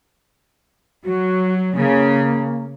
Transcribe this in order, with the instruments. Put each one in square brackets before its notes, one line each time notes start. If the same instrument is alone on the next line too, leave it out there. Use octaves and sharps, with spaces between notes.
[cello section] F#3 [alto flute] F#4
[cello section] C#3 [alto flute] A#3